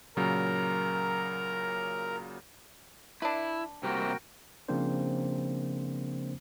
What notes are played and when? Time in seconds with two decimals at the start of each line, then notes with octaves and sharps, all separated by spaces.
0.17 A#2 C#3 F#3 A#4 A#5
3.22 D4 E4 B4
3.83 C3 G3 A#3 F#4 A#4 G5
4.69 C#3 F3 A#3 C4 D4 C5